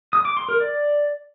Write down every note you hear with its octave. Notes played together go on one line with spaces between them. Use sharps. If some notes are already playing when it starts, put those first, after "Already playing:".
D#6
D6
C6
A#4
D5